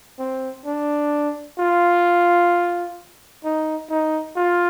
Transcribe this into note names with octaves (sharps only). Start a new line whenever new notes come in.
C4
D4
F4
D#4
D#4
F4